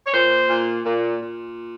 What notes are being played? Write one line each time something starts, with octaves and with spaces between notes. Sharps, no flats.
C#5
A#2 C5
A#2
A#2
A#2